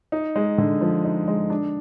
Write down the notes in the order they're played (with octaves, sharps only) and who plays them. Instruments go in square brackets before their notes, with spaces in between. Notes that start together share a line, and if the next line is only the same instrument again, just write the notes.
[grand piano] D#4
G#3
D3
F3
D#4
G#3
D4